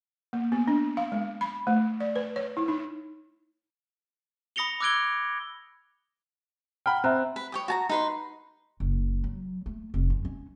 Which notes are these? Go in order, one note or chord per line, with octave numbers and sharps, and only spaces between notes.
A#3
B3
D4
F5
G#3
B5
A3
D5
B4
C#5
E4
D#4
B5 D#6 A#6 C#7 F7 G7
D6 E6 F#6 G#6 D7 G7
F#5 G5 A#5 B5 F6
C4 E5 A#5 F#6
B4
C#5 G5 D#6
F#4 A5 A#5
D#4 B4 C6
F#1
F#3
A3
F1
F#2
C#4